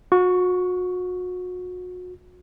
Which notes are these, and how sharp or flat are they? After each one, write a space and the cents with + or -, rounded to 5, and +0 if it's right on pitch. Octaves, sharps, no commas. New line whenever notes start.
F#4 -35 C#6 +5